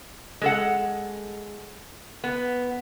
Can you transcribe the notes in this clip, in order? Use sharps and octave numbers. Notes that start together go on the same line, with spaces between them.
G#3 A4 F#5
B3